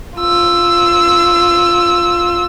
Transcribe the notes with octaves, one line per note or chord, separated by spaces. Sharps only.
F4 E6